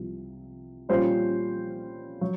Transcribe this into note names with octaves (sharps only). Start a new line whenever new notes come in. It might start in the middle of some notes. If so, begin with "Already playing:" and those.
Already playing: C2 C3 F3
A#2 G3 A#3 C#4 F4 C5
F#3